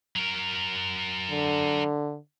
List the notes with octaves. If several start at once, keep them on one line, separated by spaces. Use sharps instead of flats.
F#3 A#4
D3